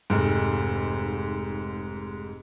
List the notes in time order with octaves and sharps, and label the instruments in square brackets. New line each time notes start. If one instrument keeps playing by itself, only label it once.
[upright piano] F1 G#2